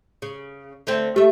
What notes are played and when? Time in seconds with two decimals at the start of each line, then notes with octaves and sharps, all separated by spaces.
0.22 C#3
0.87 D3 A3 C4
1.16 A3 G4 E5